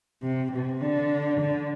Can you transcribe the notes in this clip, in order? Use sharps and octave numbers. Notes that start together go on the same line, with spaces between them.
C3
C3
D3
D3